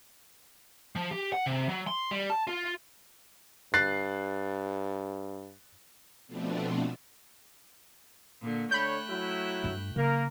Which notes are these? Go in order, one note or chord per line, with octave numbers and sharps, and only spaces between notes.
F3
G4
F#5
C3
F#3
C6
G3
A5
F4
G2 F#6 A6 C7
B2 F3 A3 B3 C4 D4
A#2 D3
D3 A3 C#5 G5 B5 F#6 G6
F#3 E4
G2 F4
C#3 F#3 A#3 A#4